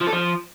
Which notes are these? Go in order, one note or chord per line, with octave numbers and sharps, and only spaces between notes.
F3
A4
F3